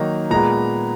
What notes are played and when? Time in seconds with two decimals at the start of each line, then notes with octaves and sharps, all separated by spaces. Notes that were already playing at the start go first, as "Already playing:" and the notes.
Already playing: D#3 F#3 A#3 D#4 A#5
0.30 A#2 G#3 B3 A#5